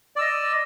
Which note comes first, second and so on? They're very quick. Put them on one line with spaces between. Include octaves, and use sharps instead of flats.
D5 E6 D#5